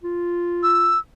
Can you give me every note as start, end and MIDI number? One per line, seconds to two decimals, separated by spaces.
0.03 0.94 65
0.63 0.99 88